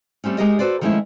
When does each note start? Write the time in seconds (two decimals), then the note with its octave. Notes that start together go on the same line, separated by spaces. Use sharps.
0.24 G3 A3 C4 C#4
0.38 G#3 D#4 G4 G#4 A#4 D#5
0.59 F#4 G4 A4 B4 C5 D5
0.81 D#3 F3 G#3 A3 C#4 E4